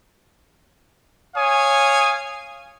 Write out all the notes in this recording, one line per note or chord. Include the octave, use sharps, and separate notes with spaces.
C#5 F5 G#5 D#6